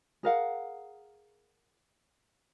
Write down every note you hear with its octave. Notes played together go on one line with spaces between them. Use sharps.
G#4 A#4 F5 F#5